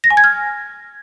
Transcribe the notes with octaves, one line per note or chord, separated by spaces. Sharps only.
A#6
G#5
G#6
F6